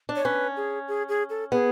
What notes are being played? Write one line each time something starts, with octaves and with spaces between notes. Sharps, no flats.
D4
C#5
C#4 B4
G#4
G#4
G#4
A4
B3 G#4